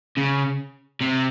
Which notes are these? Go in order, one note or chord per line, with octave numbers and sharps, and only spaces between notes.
C#3
C3